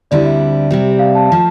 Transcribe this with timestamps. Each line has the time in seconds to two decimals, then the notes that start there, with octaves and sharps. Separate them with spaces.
0.11 D2 D3 G3 C4 E4 D5
0.26 E5
0.71 C3 G3 C4
0.99 F5
1.15 A5
1.29 F3 A3 A5